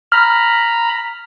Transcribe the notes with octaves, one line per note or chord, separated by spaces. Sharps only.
A#5 B5 F6